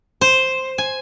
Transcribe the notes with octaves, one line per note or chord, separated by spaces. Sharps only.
C5
G#5